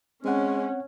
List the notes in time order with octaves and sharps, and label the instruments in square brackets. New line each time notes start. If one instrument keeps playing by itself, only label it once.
[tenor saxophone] G#3 [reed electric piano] C4 F#5 [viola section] C#4